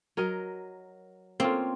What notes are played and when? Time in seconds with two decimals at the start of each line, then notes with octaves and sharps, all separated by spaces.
0.17 F#3 A#4 D#5
1.40 A#3 C4 C#4 F4